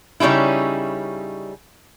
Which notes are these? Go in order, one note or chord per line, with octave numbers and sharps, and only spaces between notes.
C#3 G3 C#4 D#4 E4